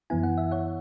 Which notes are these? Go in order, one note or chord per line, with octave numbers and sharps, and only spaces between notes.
F#2 E3 B3 E4 G#5
F#5
E5
C#5 F#5